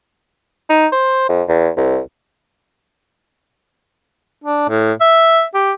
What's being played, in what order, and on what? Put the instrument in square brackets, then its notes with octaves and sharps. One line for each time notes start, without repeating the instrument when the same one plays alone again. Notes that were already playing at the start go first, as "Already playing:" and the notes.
[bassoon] D#4
C5
F2
E2
C2
[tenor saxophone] D4
A2
E5
G4